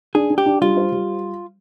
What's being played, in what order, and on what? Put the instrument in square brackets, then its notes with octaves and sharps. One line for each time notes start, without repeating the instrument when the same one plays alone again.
[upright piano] D4 [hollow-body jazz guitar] G#4
[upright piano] D4
[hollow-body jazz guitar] G4
[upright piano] D4
[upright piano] G3 [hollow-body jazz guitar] F4
[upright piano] C5
G3